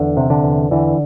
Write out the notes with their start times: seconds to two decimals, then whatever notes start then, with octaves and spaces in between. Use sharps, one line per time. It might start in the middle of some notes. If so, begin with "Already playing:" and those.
Already playing: E2 D3
0.17 C3
0.30 D3
0.44 E2
0.71 D3 E3